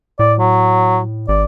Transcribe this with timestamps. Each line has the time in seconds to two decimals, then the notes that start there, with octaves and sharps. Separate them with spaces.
0.19 A2 D5
0.39 F#3
1.28 G#1 D5